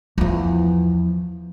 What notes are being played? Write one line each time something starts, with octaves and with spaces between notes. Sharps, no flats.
E2 F3